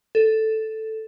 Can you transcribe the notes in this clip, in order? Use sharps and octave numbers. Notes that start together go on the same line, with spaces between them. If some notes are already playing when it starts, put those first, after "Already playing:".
A4